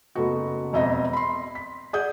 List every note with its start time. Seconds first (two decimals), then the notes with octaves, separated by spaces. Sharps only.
0.15 F#1 A3 B3 F#4
0.73 E1 F2 D#5 E5 A#6
1.13 B5 C6
1.55 B6
1.93 G#4 D5 F#5 D#6 G6